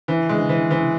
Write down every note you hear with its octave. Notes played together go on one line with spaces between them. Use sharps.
E3
G#3
E3
E3